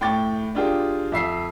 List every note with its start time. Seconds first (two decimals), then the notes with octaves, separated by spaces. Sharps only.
0.01 A2 G5 C#6 D6 A6
0.55 D4 F4 G4 G#4
1.12 F2 E5 C7